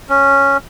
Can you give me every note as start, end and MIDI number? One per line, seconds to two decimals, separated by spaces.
0.09 0.57 61